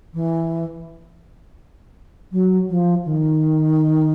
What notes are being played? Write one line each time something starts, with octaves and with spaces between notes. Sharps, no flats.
E3
F#3
F3
D#3